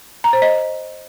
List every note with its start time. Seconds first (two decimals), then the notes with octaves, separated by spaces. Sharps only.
0.24 A#5
0.33 C5
0.42 D#5